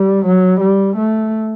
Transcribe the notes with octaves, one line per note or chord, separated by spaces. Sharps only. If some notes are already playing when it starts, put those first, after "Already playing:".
Already playing: G3
F#3
G3
A3